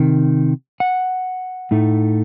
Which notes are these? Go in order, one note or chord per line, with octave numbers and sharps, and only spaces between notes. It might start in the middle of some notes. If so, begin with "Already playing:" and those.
Already playing: C3 D#3
F#5
A2 A3 D#4